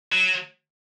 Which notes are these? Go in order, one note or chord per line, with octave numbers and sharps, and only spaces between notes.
F#3